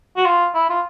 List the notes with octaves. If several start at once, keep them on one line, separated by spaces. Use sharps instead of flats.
F#4
F4
E4
F4